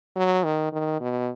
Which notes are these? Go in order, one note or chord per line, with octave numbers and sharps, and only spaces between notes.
F#3
D#3
D#3
B2